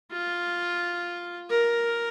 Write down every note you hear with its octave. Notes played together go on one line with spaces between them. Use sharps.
F4
A#4